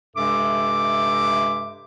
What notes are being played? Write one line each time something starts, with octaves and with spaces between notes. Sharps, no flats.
G2 C3 G#3 A4 E5 D6